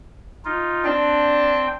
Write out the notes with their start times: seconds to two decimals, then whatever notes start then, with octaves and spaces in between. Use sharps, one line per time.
0.45 D#4 F4
0.85 C4 D4 G5